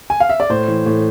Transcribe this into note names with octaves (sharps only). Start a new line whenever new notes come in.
G#5
F5
E5
D5
A2 C5
E3
A2